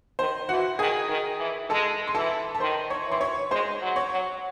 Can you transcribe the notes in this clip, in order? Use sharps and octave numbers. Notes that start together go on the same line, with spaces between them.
D#3 C5
E3 F#4 F#5
D#3 G#4 G#5
D#3
E3
G#3 A4 A5
C6
E3 A4 A5
A5
D#3 C5 C6
C#5 C#6
E3
C6
C#5 C#6
G#3 C5 C6
F#3
C#5 C#6
F#3